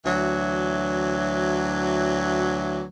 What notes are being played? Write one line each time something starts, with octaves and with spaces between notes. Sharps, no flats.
D2 E3 F#3